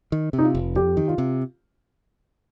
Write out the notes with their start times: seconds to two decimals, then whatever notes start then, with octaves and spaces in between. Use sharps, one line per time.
0.12 D#3
0.33 C3
0.38 D#4
0.44 F4
0.55 F1
0.75 F2 G4
0.97 D#3
1.08 F4
1.18 C3